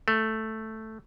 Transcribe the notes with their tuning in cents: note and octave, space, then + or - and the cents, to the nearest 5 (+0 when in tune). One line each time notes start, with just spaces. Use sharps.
A3 +0